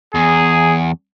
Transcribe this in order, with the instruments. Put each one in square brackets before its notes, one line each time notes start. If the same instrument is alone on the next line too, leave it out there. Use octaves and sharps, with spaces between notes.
[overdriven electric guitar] E2 [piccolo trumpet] G#4